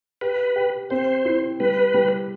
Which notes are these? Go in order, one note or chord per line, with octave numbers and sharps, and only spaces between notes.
G4 B4
G4
C4 C5
E4
G3 B4
G3